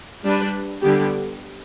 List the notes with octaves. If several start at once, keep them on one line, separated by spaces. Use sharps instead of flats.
G3 D4 B4
D3 G3 B3 G4